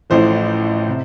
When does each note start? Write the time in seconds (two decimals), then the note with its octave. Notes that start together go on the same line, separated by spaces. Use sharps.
0.10 A1 A2 F3 C5
0.88 C3